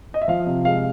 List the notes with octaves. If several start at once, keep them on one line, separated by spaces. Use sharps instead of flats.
D#5
E5
F3 F5
C3
G#3 F5